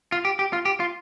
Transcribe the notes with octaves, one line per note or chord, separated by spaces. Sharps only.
F4
G4
G4
F4
G4
F4